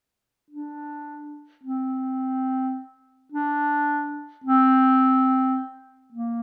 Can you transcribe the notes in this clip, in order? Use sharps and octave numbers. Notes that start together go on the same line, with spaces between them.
D4
C4
D4
C4
A#3